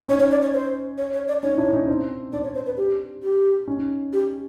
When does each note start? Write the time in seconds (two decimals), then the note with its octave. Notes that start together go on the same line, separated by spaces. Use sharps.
0.08 C#4 D#4 C#5
0.20 C#5
0.31 D5
0.42 C#5
0.54 C5
0.98 C#5
1.13 C#5
1.28 D5
1.43 C#4 D#4 C#5
1.58 D4 E4
1.73 C#4 D#4
1.88 C4 D4
2.33 C4 D4 D5
2.44 C#5
2.55 C5
2.66 B4
2.77 G4
3.23 G4
3.67 C#4 D#4
4.13 G4